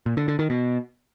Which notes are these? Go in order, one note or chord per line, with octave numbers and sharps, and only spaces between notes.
A#2
D3
D3
D#3
B2